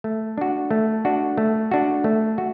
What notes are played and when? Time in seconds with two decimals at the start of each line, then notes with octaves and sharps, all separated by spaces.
0.04 A3
0.38 D4 F#4
0.71 A3
1.05 D4 F#4
1.38 A3
1.71 D4 F#4
2.04 A3
2.38 F#4